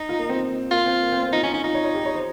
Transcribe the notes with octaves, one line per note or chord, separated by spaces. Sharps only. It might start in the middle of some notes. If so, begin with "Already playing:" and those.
Already playing: D#4
F4
A#3
C4
A#3 F4
C4
A#3
C4
C4
D#4 F4
C#4 F4
C#4 D#4
D#4 F4
C#5
C#5
G4
C#5
C5